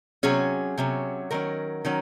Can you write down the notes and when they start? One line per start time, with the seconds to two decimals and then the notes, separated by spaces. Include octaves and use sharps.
0.23 C3 F#3 C#4 G#4
0.78 C3 F#3 C#4
1.31 D#3 F#3 C#4 A#4
1.85 D#3 F#3 C#4